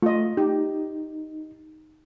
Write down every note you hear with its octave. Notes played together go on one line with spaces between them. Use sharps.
A3 F4 D#5
D#4 G4